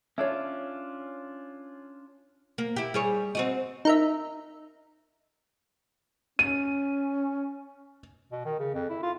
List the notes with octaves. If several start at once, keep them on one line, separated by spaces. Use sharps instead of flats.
C#4 D4 F4 C#5 E5
A#3
E4 G4
G3 G#4 C#5
C4 F#4 D#5
D#4 A#4 E5
C#4 D#7
B2
D#3
C#3
F2
E4
F4